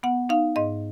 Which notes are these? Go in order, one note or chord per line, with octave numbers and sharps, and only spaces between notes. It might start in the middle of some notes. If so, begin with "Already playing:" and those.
B3 F#5
D#4 F5
G#2 D#5